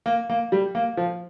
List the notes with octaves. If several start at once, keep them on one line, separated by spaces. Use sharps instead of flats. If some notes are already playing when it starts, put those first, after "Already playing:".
A#3
A#3
G3
A#3
F3